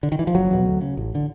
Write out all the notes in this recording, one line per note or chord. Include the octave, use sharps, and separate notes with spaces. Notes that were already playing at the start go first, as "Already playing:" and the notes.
D3
D#3
E3
F3
F#1 F#3
E2 B2
D2
C#3
A1
D3